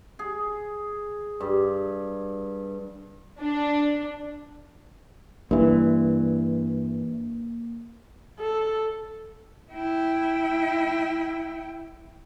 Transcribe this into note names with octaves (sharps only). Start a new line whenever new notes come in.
G#4
G2
D4
G2 E3 A#3
A4
E4 G5